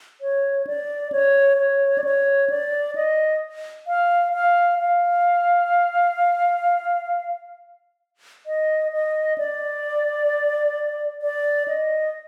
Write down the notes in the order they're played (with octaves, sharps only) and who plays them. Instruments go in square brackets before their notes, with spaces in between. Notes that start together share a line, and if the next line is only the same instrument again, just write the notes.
[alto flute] C#5
D5
C#5
C#5
D5
C#5
D5
D#5
F5
F5
F5
D#5
D#5
D5
D5
D#5